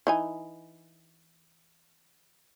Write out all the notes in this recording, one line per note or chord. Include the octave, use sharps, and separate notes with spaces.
E3 D#4 G#5